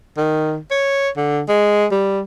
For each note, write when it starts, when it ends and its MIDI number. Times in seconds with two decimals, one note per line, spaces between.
0.17 0.58 51
0.71 1.09 73
1.17 1.42 50
1.48 1.86 56
1.92 2.22 55